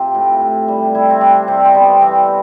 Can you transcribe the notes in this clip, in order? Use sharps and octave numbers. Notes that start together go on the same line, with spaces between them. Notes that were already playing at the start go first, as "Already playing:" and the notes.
Already playing: C3 F4
A2
A2
G3
G3 E4
C4
G3 D4
C3 C4
C4
G3 B3
E3 C4